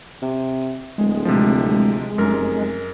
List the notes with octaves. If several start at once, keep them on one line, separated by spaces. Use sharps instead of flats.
C3
D1 G#3
C3 F3
F1 F#2 A#4